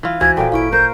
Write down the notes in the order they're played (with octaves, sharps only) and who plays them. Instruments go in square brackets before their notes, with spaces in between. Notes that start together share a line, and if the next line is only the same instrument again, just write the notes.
[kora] E3 F4
[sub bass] C#2 [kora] E3 [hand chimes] F#4 C5 G#5 [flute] G#6
[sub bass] D#1 [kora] A#2 F4 [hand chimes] A4 [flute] G5
[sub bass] G#1 [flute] E4 [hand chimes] F5 C#6 D7
[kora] A#4 C5 [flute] G6